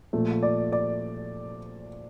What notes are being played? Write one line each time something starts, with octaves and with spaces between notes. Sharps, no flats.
A#2 F3 A3
D5
D5